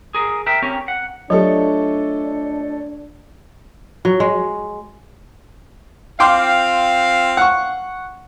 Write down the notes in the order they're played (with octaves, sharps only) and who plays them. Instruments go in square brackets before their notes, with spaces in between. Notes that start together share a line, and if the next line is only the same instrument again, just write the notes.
[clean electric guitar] G#4 A#4
A#4 E5 G5
C4 C#4 G4 A#4 C#5
F#5
[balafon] F#3 G4 [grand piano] A3 A4 C#5 [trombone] D4 [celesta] F4 D#5
[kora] F#3
G#3
[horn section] C4 F4 F5 [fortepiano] G5 C6 D6
[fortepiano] F#5 C#6